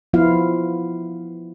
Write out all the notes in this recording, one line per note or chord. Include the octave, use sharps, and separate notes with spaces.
F3 B3 E4 F4 F5